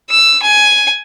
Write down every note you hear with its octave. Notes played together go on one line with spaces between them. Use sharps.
E6
G#5